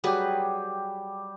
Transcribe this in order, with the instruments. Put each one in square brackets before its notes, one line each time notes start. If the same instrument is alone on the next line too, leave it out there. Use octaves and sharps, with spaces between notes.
[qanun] F#3 G#4 B4 [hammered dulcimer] G3 G4